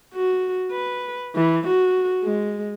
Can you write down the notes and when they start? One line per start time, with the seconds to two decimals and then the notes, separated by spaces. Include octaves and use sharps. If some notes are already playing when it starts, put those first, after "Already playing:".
0.14 F#4
0.71 B4
1.35 E3
1.67 F#4
2.23 G#3